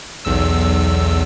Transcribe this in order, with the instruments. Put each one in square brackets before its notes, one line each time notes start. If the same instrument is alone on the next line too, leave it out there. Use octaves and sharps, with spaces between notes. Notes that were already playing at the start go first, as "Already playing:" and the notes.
[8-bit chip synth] B1 E2 E6